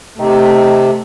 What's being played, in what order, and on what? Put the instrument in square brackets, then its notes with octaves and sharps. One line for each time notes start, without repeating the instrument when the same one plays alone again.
[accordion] C3 [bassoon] D#3 [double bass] A3